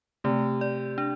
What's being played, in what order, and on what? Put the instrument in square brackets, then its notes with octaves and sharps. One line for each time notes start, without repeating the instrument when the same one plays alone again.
[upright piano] C3 [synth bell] A3
[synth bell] D5
D4